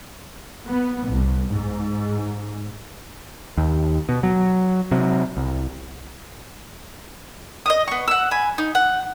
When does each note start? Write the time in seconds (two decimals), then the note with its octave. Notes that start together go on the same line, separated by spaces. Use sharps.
0.67 B3
1.09 C2
1.50 G#2
3.57 D#2
4.09 B2
4.23 F#3
4.91 C3 F#3
5.37 C2
7.66 D#5 E5 D#6
7.88 B3 C#6
8.08 F#5 E6
8.31 G#5 B5
8.58 D#4
8.75 F#5